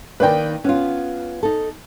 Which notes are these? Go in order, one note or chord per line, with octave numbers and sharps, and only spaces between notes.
D#3 A#3 B4 D5 G5
B3 C#4 F4
D#4 A4